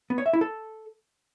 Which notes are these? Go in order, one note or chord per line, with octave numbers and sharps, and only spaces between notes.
B3
C#5
E5
E4
A4